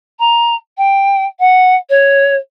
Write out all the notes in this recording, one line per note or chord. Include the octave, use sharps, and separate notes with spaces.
A#5
G5
F#5
C#5